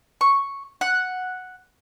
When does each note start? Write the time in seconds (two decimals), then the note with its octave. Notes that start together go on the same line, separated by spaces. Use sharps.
0.21 C#6
0.81 F#5